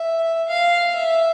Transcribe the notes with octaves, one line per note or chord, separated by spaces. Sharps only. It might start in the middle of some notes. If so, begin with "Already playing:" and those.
Already playing: E5
F5
E5